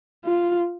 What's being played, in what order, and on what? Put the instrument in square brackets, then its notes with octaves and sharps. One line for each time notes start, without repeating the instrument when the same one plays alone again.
[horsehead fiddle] F4